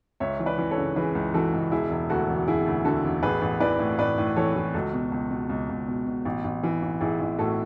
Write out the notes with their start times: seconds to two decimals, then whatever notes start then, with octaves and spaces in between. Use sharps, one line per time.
0.20 C#2 C#5 E5
0.39 E3
0.46 B4 D5
0.58 E3
0.71 A4 C#5
0.77 C#3
0.96 E3 G#4 B4
1.15 C#2
1.34 E3 F#4 A4
1.53 C#2
1.72 E1 E4 G#4
1.90 E1
2.10 D2 F#4 A4
2.28 E1
2.48 E1 E4 G#4
2.66 D2
2.85 D3 F#4 A4
3.04 E1
3.23 A1 G#4 B4
3.42 A1
3.60 E3 B4 D5
3.79 A2
3.98 A2 B4 D5
4.18 A2
4.36 E3 A4 C#5
4.55 E3
4.74 C#2 F#4 A4
4.93 B2
5.12 C#2
5.31 B2
5.49 C#2
5.69 C#2
5.87 B2
6.06 B2
6.25 A1
6.44 A1
6.63 E3
6.82 A1
7.01 A1 E4 G#4
7.20 A1
7.38 A2 F#4 A4